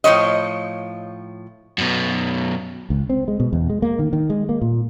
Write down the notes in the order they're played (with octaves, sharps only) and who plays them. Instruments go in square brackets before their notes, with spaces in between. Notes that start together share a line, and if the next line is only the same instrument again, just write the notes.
[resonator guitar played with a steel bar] A2 F3 F#3 C#5 D#5
[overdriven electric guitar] F#2 B2
[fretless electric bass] C#2
C4
G#3
B2
E2
G#3
A#3
D#3
D#3
G#3
A#3
A#2